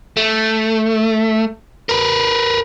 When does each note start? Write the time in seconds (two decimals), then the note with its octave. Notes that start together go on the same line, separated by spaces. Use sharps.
0.17 A3
1.89 A#4 B4